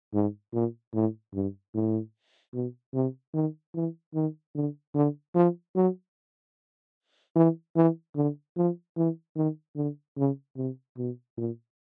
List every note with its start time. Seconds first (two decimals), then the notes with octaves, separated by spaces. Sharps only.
0.14 G#2
0.53 A#2
0.94 A2
1.34 G2
1.74 A2
2.54 B2
2.94 C3
3.34 D#3
3.75 E3
4.14 D#3
4.55 D3
4.94 D3
5.35 F3
5.75 F#3
7.36 E3
7.76 E3
8.16 D3
8.57 F3
8.96 E3
9.36 D#3
9.76 D3
10.17 C#3
10.57 C3
10.98 B2
11.37 A#2